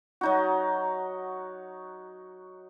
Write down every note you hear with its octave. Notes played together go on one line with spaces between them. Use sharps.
F#3 D#4 F#4